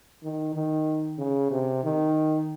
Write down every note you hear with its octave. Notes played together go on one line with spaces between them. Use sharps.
D#3
D#3
C#3
C3
D#3